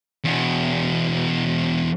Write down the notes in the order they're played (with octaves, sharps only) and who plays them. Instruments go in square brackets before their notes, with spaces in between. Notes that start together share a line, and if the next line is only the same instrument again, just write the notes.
[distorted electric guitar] E2 B2